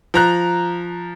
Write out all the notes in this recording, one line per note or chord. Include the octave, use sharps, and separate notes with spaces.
F3 A#5 F#6